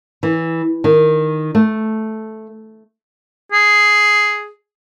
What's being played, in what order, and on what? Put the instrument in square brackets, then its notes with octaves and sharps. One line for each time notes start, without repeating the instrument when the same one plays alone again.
[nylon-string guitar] E3
D#3
A3
[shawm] G#4